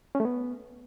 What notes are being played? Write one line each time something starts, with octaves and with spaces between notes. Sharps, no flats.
C#4
A3
B3